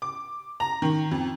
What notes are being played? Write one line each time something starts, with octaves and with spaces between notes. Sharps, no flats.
D6
A#5
D#3
F2